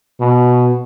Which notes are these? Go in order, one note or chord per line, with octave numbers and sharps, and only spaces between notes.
B2